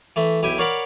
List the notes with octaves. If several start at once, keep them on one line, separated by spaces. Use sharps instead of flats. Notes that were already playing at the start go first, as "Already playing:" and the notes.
E3 A3 E5
B1 E4 G4 G5 G#5
A#4 C#5 D5 F5 F#5 B5